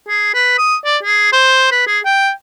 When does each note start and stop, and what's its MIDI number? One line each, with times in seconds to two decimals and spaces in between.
0.08 0.33 68
0.34 0.53 71
0.58 0.76 87
0.85 0.98 74
1.03 1.31 68
1.32 1.70 72
1.72 1.83 71
1.87 1.99 68
2.05 2.30 79